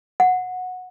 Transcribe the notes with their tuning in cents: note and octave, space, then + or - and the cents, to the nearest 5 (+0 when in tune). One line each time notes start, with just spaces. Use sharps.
F#5 -15